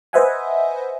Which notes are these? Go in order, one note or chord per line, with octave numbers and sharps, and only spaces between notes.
B4 C5 D#5 E5 F#5 G#5